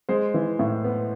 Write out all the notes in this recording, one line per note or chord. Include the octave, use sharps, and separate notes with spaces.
G#3 C5
E3
A2
B3